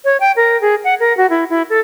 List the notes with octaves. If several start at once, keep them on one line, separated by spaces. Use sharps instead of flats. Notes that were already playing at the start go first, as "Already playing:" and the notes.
C#5
G5
A#4
G#4
F#5
A#4
F#4
E4
E4
A4